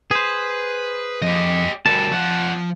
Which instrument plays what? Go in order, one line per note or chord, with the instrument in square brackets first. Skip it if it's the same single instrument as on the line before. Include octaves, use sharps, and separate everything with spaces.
[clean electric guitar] G#4 C5 [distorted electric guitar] B4
[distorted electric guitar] F2 [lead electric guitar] G4 D#5
[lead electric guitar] D2 G3 [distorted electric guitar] F#4 A#4 [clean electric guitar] A5
[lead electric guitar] F2 F#5 [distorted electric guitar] F3